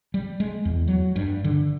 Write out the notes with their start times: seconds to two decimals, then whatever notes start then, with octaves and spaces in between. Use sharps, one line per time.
0.14 G3
0.40 G#3
0.65 E2
0.87 F#3
1.16 G2
1.44 D3